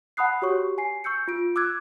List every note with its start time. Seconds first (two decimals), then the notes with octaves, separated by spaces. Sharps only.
0.17 F#5 A5 B5 D#6 F#6 C7
0.42 F#4 G4 C#5 C#6
0.78 G#5 C7
1.04 C#6 E6 G6 C#7
1.28 F4 D7
1.56 D6 E6 F#6 G#6